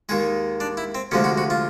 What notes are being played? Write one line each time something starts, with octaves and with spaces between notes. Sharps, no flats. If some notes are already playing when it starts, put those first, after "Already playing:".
D#2 D#3 G#3 G#4
D4
E4
C4
D2 C3 F3 G#3 C#4
F#4
F#4
F4